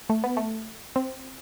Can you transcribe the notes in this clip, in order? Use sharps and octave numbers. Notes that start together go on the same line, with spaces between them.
A3
B3
A3
C4